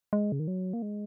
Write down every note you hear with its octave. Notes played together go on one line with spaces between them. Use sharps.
G#3
C#3
D#3
F#3
A#3
G#3